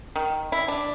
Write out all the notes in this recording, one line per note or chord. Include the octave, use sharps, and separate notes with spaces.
D#3
E4
D4